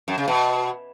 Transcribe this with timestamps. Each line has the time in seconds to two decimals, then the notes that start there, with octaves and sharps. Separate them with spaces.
0.08 F#2
0.18 C#3
0.28 B2